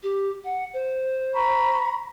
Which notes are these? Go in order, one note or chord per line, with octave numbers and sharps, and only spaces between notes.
G4
F#5
C5
A#5 B5 C#6